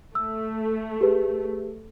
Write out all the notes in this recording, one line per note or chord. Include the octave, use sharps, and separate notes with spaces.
A3 E6
G4 G#4 B4